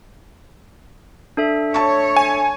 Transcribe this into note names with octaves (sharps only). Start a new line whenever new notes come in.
D4 A4 E5
C#5 A5 C#6
G#5